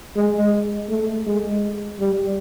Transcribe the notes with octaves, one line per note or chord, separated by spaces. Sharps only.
G#3
A3
G#3
G3